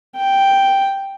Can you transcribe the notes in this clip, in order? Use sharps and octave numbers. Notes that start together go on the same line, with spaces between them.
G5